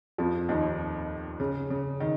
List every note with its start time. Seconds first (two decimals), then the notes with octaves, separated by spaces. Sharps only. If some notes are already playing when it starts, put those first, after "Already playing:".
0.18 F2 F3
0.49 D#2 D#3
1.40 C#3
1.70 C#3
2.00 D#3